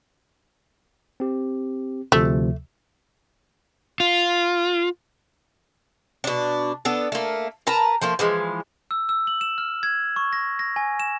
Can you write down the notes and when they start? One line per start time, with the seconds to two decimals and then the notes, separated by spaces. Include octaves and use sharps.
1.20 C4 G4
2.12 D2 C3 F3 A3
4.00 F4
6.24 B2 D4
6.85 B3 D4 A4
7.12 A3 A#3
7.67 A#4 B4 A5 A#5
8.01 F3 A3 A#3
8.19 E3 F3 G#3
8.91 E6
9.09 E6
9.27 F#7
9.41 E7
9.58 F6
9.83 G#6
10.16 C#6
10.33 A#6
10.59 A#6
10.76 G#5
11.00 E7